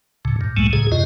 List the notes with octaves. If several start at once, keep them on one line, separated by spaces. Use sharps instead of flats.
D2 A2 C#3
G2 A#2
C#2 A2 F#3 G#3 A3
D#2 A2 C#3 G#4
F#2 C3 F4 D#5